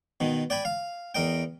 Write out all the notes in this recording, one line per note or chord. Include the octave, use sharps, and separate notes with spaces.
B2 D#3
D5 G5 G#5 B5
F5
E2 A#4 D#5 G5